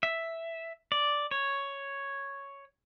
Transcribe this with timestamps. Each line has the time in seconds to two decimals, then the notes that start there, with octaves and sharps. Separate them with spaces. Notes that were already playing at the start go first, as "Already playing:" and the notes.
0.03 E5
0.92 D5
1.31 C#5